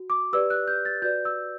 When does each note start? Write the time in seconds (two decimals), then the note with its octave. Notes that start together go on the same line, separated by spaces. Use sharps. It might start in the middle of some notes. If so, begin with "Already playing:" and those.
Already playing: F#4
0.10 D6
0.33 G4 B4 D5 E6
0.50 F#6
0.68 G6
0.85 A6
1.02 F#4 B4 D5 G6
1.25 E6